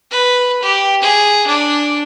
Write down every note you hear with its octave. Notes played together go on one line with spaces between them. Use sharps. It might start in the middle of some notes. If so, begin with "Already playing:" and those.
B4
G4
G#4
D4